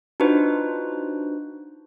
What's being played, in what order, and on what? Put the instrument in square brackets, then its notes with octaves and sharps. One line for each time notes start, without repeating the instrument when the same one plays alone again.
[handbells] D4 D#4 F4 F#4 B4 C5